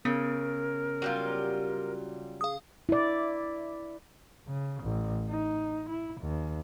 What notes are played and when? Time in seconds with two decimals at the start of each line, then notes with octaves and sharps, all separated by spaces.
0.05 C#3 B3 A#4
1.02 F#3 G3 F4
2.41 G#4 F5 D#6
2.89 E4 D5
4.47 C#3
4.83 A1
5.29 D#4
5.89 E4
6.21 D#2